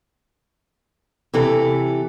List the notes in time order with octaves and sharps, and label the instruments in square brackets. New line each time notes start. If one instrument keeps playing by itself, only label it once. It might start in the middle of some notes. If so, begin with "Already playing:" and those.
[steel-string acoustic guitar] C3 E3 A4